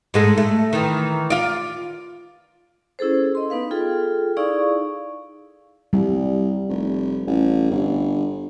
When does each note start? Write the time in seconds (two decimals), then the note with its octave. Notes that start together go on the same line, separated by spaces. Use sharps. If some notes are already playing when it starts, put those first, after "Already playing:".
0.14 G#2 G#3 A3
0.38 A3
0.73 D#3 E3
1.30 F4 D5
2.99 C#4 E4 G#4 A4 C5
3.35 D#5 C6
3.50 B3 D#4 B4 F5
3.71 F4 G#4 A4 G5
4.37 D#4 E4 G#4 D5 F5 C#6
5.93 C2 G3
6.69 F1
7.27 A1
7.71 G1